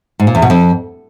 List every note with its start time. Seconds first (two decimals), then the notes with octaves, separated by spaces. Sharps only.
0.20 G#2
0.27 A#2
0.35 E2
0.42 B2
0.50 F2